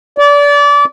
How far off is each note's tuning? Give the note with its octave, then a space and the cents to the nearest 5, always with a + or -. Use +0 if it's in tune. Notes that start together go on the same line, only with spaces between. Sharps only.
D5 -30